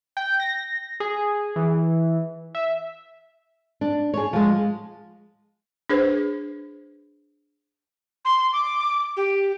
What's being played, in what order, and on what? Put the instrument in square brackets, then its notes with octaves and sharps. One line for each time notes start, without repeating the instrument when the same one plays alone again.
[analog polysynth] G5
A#6
G#4
E3
E5
[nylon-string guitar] D4
G#4 C#5
F3 G#3
[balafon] D4 G#4 B4 C5
[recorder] C6
D6
G4